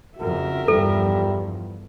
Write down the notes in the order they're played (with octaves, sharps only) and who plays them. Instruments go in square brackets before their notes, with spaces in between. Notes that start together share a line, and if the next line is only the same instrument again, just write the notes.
[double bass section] F2 C#3 [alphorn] F#4 [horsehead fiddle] A#4 E5
[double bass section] E2 G2 F3 [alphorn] G3 [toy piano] A4